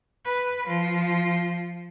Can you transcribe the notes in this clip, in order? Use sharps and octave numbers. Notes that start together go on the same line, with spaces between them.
B4
F3